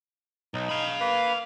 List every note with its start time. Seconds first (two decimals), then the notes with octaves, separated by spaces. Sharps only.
0.54 B1 D#4
0.69 F5 B5
1.00 A#3 B4